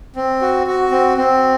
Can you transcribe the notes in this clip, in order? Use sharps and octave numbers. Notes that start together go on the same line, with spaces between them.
C4
F#4
F#4
C4
C4